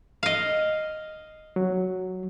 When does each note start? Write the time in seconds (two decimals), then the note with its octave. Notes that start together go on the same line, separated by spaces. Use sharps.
0.23 D#5 F5
1.56 F#3